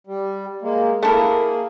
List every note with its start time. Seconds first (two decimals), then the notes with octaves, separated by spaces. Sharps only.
0.07 G3
0.62 G#3 A#3
1.03 A3 A#3 E4 G#4 A#4